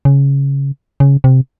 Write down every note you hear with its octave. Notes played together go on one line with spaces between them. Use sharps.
C#3
C#3
C3